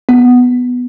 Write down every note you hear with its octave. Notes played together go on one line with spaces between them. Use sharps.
B3